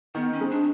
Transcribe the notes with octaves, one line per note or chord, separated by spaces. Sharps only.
D#3 B3
C#4
G#3 C4
D4